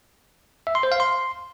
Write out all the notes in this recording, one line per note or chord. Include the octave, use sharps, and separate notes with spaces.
E5
C6
C5
F5
C6